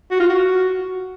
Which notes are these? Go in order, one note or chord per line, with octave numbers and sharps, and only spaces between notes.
F#4
F4
F#4